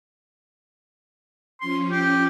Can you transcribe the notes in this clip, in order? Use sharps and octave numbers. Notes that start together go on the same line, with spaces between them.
F3 C#4 C6
G4